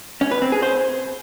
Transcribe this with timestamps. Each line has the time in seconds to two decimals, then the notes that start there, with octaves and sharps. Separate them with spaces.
0.21 C#4
0.31 B4
0.42 C4
0.52 G#4
0.62 C5